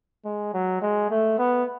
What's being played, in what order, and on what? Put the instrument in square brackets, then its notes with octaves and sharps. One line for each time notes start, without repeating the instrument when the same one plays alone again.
[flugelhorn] G#3
F#3
G#3
A3
B3